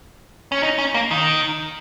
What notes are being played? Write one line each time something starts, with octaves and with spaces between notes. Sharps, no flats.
C#4
D#4
C#4
A#3
D#3